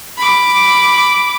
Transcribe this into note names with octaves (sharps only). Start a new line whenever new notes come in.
B5 D6